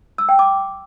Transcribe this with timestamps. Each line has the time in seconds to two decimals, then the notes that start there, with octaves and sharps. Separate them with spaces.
0.18 E6
0.29 G5
0.39 D6